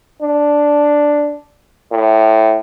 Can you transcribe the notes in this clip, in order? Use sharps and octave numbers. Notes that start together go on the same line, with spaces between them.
D4
A2